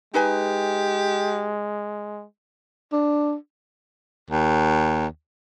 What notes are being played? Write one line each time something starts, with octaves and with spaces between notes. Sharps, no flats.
G#3 D#4 G4 B4 G#5
D4
D#2